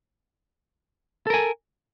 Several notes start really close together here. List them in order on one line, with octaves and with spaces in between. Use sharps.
A4 A#4 G#5